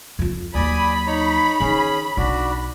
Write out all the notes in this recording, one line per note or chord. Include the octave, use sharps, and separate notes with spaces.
F2 F4
D#2 F#3 D5 G#5 B5 D#6
D#4 C#5 A#5
D#3 C#4 G#4
B1 D4 F#4